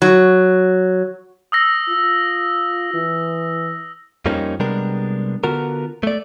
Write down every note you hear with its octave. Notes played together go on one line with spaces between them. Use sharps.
F#3
D#6 E6 A#6
F4
E3
F2 F3 G3 A#3 C#4 D#4
C3 G3 G#3 B3 D4 A#4
D3 B3 F4 F#4 A#4
A3 D5